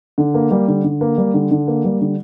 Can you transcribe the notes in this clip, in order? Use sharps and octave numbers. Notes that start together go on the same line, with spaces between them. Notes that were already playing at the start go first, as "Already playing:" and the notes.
D3
A#3
G3
D3
D3
A#3
G3
D3
D3
A#3
G3
D3